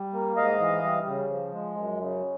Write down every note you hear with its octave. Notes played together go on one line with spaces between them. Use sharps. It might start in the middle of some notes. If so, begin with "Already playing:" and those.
Already playing: G3
A#3
G#2 D#5 F5
E3
G3
C#3
F3
G#3
F#2
C#3